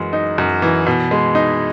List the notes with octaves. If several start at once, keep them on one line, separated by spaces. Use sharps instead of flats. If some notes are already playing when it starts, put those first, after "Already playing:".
Already playing: F#2 E3 G#3
D#4
F#2
E3
B2
G#3
D#4